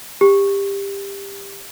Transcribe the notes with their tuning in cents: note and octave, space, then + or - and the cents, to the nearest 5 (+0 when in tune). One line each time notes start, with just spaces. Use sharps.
G4 +20